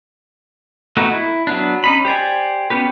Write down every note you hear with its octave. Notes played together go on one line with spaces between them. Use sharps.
A3 B3 D#4 F#4
E4
F#3 B3 D4
C#4 D#4 B5
G4 C5 D5 G#5
B3 C#4 G4 B4